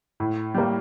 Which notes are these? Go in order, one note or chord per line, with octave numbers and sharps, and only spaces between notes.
A2
G3 A#3